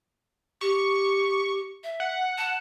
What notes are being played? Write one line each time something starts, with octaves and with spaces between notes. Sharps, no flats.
G4 C#6
E5
F#5
A5